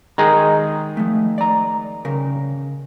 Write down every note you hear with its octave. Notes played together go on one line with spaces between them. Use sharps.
D#3 G#3 G#4 A#5
F3 A3
D5 A#5
C#3 A#4